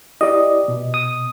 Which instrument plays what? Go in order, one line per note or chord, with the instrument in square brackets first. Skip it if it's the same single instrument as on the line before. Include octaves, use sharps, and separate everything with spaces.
[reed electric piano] E4 G4 D5 [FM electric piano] D#5
[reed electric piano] B2
[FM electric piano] D#6